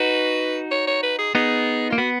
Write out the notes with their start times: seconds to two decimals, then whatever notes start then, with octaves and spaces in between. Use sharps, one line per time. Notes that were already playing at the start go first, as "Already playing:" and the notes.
Already playing: D#4 F#4 B4
0.71 C#5
0.88 C#5
1.03 B4
1.19 G#4
1.35 B3 D#4 G#4
1.90 A#3 F4
1.98 B3 F#4